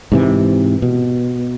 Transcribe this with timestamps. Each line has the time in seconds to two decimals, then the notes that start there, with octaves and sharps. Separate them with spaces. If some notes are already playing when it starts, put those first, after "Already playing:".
0.12 G#2 C3 E3
0.82 B2